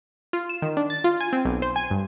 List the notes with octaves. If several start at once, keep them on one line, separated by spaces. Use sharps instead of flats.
F4
E7
D#3
D4
A6
F4
G#5
C4
B1
C5
G#5
G2